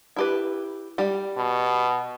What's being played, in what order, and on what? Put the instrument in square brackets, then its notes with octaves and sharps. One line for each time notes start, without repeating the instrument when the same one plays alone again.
[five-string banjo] E4 G4 B4
G3 G4
[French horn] B2